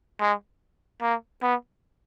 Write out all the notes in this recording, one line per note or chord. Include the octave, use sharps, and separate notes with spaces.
G#3
A#3
B3